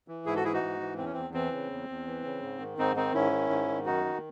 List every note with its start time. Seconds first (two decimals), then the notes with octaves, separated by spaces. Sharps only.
0.08 E3
0.26 G#2 E4 G#4
0.36 F#4 A4
0.44 E3 E4 G#4
0.53 D#4 F#4
0.63 G#2
0.80 E3
0.98 E2 C4
1.05 C#4
1.13 E2 C4
1.34 E3 C4
1.52 C#3
1.70 E2
1.89 E2
2.07 E3
2.24 C#3
2.42 G#2
2.60 D#3
2.78 G#2 C4 D#4
2.96 D#3 C4 D#4
3.14 G#2 C#4 E4
3.32 D#3
3.50 G#2
3.68 D#3
3.86 F#2 D#4 F#4
4.04 D#3